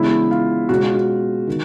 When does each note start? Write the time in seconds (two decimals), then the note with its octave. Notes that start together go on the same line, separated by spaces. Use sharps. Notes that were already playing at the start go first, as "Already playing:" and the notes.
Already playing: C#3 E3 G#3 B3 D4 E4
0.31 F4
0.69 B2 G#3 C#4 F#4
0.83 F4
0.94 F#4
1.47 D#3